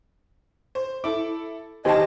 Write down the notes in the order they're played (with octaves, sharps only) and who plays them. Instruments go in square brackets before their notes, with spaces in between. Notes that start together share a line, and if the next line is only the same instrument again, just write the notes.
[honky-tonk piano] C5
[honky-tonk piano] E4 A4 [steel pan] D6
[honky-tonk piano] D#3 A5 [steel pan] G4 C5 G#5 [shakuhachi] D#5